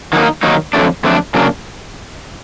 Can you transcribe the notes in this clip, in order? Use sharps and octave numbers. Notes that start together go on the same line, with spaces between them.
D#3 F#3 A#3 D#4
D#3 F#3 A#3 D#4
F2 D3 F#3 A3 D4
F2 D3 F#3 A3 D4
C#3 F#3 A#3 D4